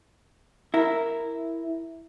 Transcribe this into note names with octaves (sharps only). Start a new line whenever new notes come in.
E4 A#4